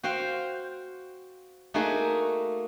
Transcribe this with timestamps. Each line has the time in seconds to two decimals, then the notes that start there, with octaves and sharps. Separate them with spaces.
0.03 F#4 C5 F5 G5
1.74 A3 A#3 D#4 F#4 G#4